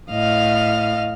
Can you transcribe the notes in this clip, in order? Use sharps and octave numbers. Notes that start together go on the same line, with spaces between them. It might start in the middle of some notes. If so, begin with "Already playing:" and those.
A2 D#5 F5 F6